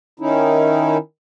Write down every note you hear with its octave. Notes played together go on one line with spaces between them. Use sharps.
D#3 C#4 D#4 E4